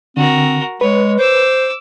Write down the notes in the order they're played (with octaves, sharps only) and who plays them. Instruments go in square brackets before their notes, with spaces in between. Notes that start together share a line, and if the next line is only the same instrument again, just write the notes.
[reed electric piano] D3 [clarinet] C4 [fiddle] F#4 A#4
[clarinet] G#3 [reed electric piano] B4 [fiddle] C#5
[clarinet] C5 [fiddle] D6 E6